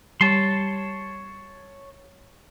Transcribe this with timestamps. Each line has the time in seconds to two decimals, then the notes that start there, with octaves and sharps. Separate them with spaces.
0.21 G3 C#5 A5 C6